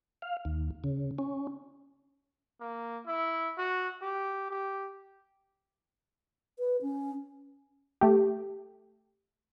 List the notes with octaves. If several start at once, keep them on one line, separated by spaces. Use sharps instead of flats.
F5
D#2
C#3
C#4
A#3
E4
F#4
G4
G4
B4
C#4
A3 G4